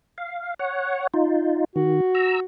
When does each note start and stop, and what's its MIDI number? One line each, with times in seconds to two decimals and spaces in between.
0.18 0.54 77
0.59 1.07 73
0.59 1.07 78
1.14 1.64 63
1.14 1.64 65
1.76 2.01 51
1.76 2.45 66
2.15 2.40 82
2.15 2.40 88